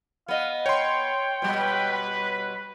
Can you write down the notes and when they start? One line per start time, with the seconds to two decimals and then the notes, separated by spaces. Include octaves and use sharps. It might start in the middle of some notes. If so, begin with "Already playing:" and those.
0.28 B3 D#5 F5
0.66 C#5 G5 C6
1.42 B2 G3 B4